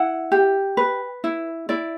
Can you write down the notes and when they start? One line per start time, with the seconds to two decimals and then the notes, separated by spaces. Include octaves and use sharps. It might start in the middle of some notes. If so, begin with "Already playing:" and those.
Already playing: E4 F#5
0.32 G4
0.77 B4
1.24 E4
1.69 E4 D5